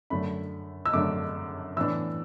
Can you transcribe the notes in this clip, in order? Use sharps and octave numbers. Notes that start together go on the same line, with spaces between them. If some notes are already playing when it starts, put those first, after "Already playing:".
F#2 D3 A3 D4 B5
E6
F#2 D3 A3 D4 D6
A2 E3 B3 D4 E6